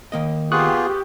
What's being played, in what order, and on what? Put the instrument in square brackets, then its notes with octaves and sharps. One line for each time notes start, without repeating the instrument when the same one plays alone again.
[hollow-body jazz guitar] D#3 A#3 D#5
[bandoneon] B3 F4 G#4 [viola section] G4 [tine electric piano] C#6 D#6 F#6